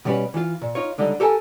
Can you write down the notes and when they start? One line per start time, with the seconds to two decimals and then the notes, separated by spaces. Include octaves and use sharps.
0.05 B2 G3 C#4 G4 B4
0.34 E3 F4
0.62 A#2
0.75 D#4 F4 C#5
0.98 C#2 D3 G3 D#4
1.20 G4 A4 A#4 G#5